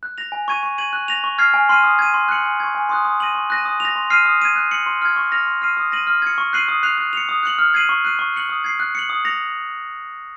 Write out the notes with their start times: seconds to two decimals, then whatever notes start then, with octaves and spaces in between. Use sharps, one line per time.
0.03 F#6
0.18 A#6 F7
0.32 G#5
0.48 C#6 G#6 D#7
0.63 C#6
0.78 G#6 D#7 F#7
0.93 F#6
1.08 A#6 F7
1.24 C#6
1.38 F6 G#6 C7
1.54 G#5
1.69 C6 F6 C7 D#7
1.84 D#6
1.99 G#6 D#7
2.14 C6
2.29 F#6 C#7 F#7
2.44 G#5
2.60 C#6 G#6
2.75 G#5
2.89 C6 D#6 F#6
3.05 D#6
3.20 A#6 D#7 F#7
3.35 C#6
3.50 F#6 A#6 D#7
3.65 D#6
3.80 F7
3.85 A#6
3.96 C6
4.10 F6 C7 D#7
4.25 D#6
4.42 G#6 D#7
4.56 F#6
4.71 C#7 F#7
4.86 C6
5.02 F6 G#6
5.16 C#6
5.32 F6 A#6 F7
5.47 C6
5.62 F6 C7 D#7
5.77 D#6
5.92 A#6 D#7 F#7
6.07 F6
6.22 G#6 C#7
6.38 C#6
6.53 F#6 C7 D#7 F#7
6.68 D#6
6.83 F#6 C7 F7
6.98 F#6
7.13 C#7 F7
7.29 D#6
7.43 F#6 C#7 F#7
7.59 F6
7.74 G#6 C7 D#7 F#7
7.89 C#6
8.05 F#6 C7 D#7
8.19 C#6
8.34 F#6 C#7 F#7
8.49 D#6
8.64 G#6 C7
8.80 F#6
8.95 C#7 F#7
9.10 D#6
9.25 A#6 C#7 F7